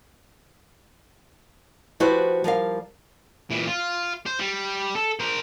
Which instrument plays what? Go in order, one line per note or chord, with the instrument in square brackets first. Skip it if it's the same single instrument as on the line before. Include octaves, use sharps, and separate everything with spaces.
[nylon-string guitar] F3 E4 F#4 G4 B4 C5
F3 G3 A#4 F5
[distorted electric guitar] A#2 E3
F4
C5
G3
A4
A#4 C5